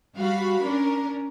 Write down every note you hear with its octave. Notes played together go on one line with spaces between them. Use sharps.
G3 F#4 F5 B5
C#4 D4 A#4